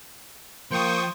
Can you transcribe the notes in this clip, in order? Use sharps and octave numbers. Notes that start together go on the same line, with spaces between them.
F3 A#3 C5 G5 C#6 D#6